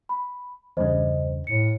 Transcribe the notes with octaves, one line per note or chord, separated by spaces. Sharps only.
B5
E2 G2 C#3 C5 D#5
A2 C#7